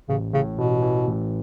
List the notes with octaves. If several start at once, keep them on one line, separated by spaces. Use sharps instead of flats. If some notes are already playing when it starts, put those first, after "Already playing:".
A1 C#3
A2 C#3
A1 B2
E3
A1